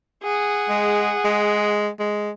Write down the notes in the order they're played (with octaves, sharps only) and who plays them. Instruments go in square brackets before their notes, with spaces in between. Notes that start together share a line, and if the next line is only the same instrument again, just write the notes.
[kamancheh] G#4 F#5
[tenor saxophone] G#3
G#3
G#3